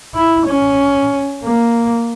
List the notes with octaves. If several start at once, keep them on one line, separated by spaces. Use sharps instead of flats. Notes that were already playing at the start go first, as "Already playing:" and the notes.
E4
C#4
A#3